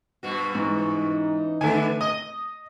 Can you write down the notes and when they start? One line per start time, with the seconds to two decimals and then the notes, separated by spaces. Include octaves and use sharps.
0.23 G2 B2 F#4
0.55 G#2 E3 C#4 D#4
1.61 D3 A3 B3 D4 G#5
2.01 D#5 D#6